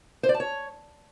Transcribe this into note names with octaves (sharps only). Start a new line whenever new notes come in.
C5
D5
A5
C#5